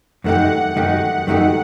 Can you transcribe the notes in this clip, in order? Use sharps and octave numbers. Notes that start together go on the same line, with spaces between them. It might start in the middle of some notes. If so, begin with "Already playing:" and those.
F#2 D#3 A3 D#4 G4 F#5
F#2 D#3 A3 D#4 G4
F#2 D#3 A3 D#4 G4